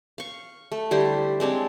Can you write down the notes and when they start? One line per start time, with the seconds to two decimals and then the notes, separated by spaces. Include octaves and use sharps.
0.18 F5 C#6
0.72 A3
0.91 D3 G3 E4 C5
1.40 G#3 C4 D4 C#5